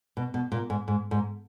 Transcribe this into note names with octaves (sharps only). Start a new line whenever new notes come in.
B2
B2
A#2
G#2
G#2
G#2